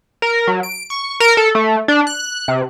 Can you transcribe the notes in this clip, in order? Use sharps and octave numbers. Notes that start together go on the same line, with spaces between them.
A#4
F#3
D7
C#6
A#4
A4
A3
D4
F#6
C3